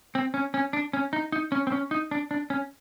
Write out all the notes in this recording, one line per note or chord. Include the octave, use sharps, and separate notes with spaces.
C4
C#4
C#4
D4
C#4
D#4
D#4
C#4
C4
C#4
D#4
D4
D4
C#4